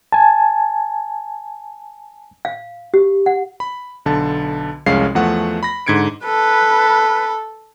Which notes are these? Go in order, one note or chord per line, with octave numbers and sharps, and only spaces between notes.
G#5 A5
F5
G4
F#5
B5
B1 D3 A5
C2 F2 G#3 C#4 F5 C7
E2 F3 A3 F#5
B5 A#6
G#2 D3 G#6 C#7 D7
A4 B4